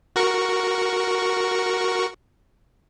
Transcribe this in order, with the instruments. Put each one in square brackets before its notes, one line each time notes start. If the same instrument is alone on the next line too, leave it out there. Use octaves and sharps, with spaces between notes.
[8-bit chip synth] F#4 A#4 C#6